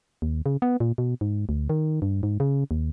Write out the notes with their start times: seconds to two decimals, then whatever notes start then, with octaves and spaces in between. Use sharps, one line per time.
0.22 D#2
0.46 C#3
0.62 B3
0.80 A#2
0.98 B2
1.21 G#2
1.49 D2
1.70 D#3
2.02 G2
2.23 G#2
2.40 C#3
2.71 D#2